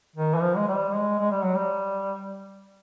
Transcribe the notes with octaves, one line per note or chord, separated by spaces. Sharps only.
D#3
E3
F3
G#3
G3
G#3
G#3
G3
F#3
G3